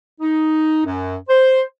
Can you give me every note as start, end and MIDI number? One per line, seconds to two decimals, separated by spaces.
0.21 0.82 63
0.86 1.17 42
1.29 1.62 72